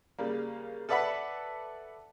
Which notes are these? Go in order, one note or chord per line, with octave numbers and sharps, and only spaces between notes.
C#3 G3 A#3
A4 B4 D5 E5 F#5 B5